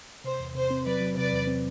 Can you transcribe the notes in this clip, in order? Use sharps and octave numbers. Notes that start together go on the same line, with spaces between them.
C3 C5
E2
C3 C5
C4
F#3 B4 D5
F#3
C3 B4 D5
E2
C4